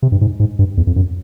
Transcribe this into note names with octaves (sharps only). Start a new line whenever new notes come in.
C3
G2
G#2
G#2
G2
E2
F2
F#2